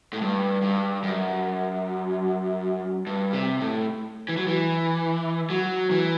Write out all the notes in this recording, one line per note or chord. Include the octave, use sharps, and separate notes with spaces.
A2
G2
G2
F#2
G2
C3
A2
E3
F#3
E3
F#3
E3